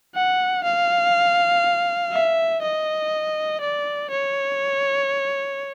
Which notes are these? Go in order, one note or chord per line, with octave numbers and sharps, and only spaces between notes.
F#5
F5
E5
D#5
D5
C#5